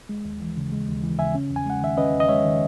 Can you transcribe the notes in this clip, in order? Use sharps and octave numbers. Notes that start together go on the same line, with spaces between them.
G#3
D#2
E3
C#3
G#3
D#2
E3
C#3 E5 G#5
C#4
E2
G#5
G#3 F#5
D#3 E5
C#4 B4 D#5
E2
D#5
G#3 C#5 E5
D#3